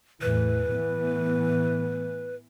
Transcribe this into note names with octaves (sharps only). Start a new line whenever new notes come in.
E2 A2 E3 B4
A2 E3 B3